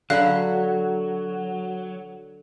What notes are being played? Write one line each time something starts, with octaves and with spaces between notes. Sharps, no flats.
D3 F#3 E5 F5 B5 F#6